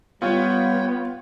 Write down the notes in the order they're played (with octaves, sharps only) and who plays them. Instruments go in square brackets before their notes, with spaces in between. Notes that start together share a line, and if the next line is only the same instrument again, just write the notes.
[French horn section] G3 [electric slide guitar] B3 [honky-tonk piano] F4 [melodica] C#5 G5